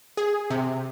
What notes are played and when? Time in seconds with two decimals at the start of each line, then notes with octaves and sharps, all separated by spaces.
0.17 G#4
0.50 C3